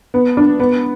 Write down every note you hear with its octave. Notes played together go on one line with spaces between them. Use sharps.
B3
D4
B3